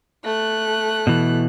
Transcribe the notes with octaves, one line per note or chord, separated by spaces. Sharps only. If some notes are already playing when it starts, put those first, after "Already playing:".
A3 F#6
B2 E3